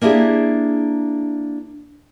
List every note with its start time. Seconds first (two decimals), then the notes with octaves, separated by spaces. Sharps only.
0.01 A#3 D4 E4 G4 G#4